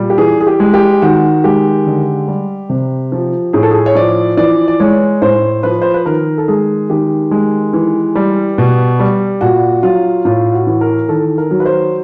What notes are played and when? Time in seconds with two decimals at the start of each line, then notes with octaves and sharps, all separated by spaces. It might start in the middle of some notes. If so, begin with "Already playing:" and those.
Already playing: A#2 G3
0.10 G4
0.18 E3 G#4
0.41 G#4
0.47 G4
0.60 G#3
0.74 G4
1.02 D#3 F#4
1.44 G#3 G4
1.87 D3
2.28 G3
2.70 C3
3.12 F3
3.53 A2 G#4
3.63 A4
3.71 G#4
3.86 C#5
3.95 F3 D5
4.37 E3 D5
4.68 D5
4.80 G#3 C#5
5.22 A2 C5
5.63 F3 B4
5.82 C5
5.94 B4
6.06 D#3 A#4
6.38 A4
6.48 G#3 G#4
6.90 D#3 G4
7.31 G#3
7.74 E3
8.15 G3
8.58 B2
9.00 G3
9.41 A#2 F#4
9.83 F#3 F4
10.25 A2 F4
10.53 F#4
10.67 E3
10.81 A#4
11.09 D#3 A4
11.38 A#4
11.51 F#3
11.60 B4
11.66 C5